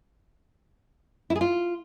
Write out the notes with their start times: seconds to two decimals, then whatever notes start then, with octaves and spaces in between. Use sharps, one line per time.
1.30 E4
1.36 G#4
1.41 F4